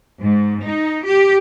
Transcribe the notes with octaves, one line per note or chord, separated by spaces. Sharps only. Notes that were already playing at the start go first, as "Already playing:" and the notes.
G#2
D#4
G4